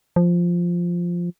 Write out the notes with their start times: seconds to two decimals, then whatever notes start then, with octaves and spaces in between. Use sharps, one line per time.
0.16 F3